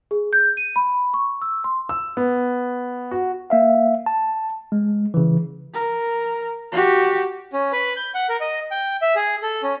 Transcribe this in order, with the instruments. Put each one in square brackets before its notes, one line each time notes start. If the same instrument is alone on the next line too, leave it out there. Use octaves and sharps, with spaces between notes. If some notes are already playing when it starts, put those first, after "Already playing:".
[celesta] G#4
G6
D#7
B5
C#6
E6
C6
[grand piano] E6
B3
F#4
[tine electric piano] A#3 E5 F5
A5
G#3
C#3 E3
[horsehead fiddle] A#4
F#4 G4
[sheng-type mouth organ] C#4
B4
G6
F#5
A#4
D#5
G5
E5
G#4
A4
C#4